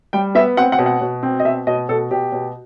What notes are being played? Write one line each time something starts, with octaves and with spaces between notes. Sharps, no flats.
G3 G5
B3 E5
C4 F#5
F#5
B2
F#5
B2
C4
D#5
B2 E5
B2 D#5
B2 A4
B2 G4
B2